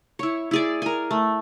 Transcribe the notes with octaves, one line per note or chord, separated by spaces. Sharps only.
E4 C#5
E4 G#4 D5
A#4 G#5
A3